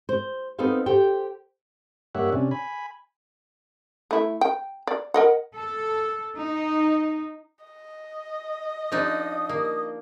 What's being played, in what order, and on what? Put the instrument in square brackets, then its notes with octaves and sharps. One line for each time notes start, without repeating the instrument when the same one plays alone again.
[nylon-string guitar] C5
B3 C4 D#4 A4 C5 F5
G4 A4 C5 G5
[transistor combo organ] G2 A#3 G4 C#5 E5 F#5
C3 C#4 D4
G#5 B5
[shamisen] A3 E4
G5
D5
A#4 D#5 F#5
[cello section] A4
D#4
[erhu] D#5
[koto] F3 D4 D#4 [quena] D#6
[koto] A#3